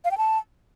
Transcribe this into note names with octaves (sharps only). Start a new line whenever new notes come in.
F5
G5
A5